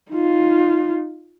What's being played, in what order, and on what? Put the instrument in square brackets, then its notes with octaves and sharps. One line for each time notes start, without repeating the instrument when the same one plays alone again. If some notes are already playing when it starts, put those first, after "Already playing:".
[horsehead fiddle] D#4 F4